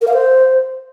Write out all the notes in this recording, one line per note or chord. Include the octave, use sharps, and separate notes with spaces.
A#4
F5
C5